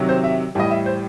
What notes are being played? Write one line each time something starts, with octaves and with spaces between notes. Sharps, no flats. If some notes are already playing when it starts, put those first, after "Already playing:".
Already playing: C3 D#3 F#3
C5
E5
A2 E3 G3 D#5
E5
C5